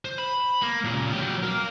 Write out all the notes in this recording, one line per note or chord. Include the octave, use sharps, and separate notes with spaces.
C5
B5
A#3
A#2 C#3
F#3 G4
A#4 F5